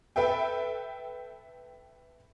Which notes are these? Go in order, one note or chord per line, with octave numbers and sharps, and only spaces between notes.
A4 B4 E5 G5